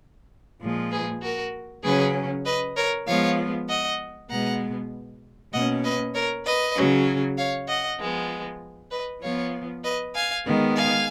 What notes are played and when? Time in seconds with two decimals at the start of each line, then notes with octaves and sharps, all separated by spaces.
0.61 A#2 F3 G#3
0.91 G#4 B4
1.22 F#4 A#4
1.84 C#3 F#3 C#4 G#4 B4
2.46 B4 D#5
2.76 A#4 C#5
3.07 F3 G#3 B3 C#5 F5
3.69 D#5 F#5
4.30 B2 G#3 B3 F#5 A#5
5.53 B2 A#3 C#4 D#5 F#5
5.84 B4 D#5
6.14 A#4 C#5
6.46 B4 D#5
6.77 C#3 F#3 C#4
7.38 C#5 F5
7.69 D#5 F#5
8.00 F3 G#3 B3
8.92 B4 D#5
9.23 F3 B3 C#5 F5
9.84 B4 D#5
10.15 F5 G#5
10.46 D#3 G#3 B3
10.77 F5 G#5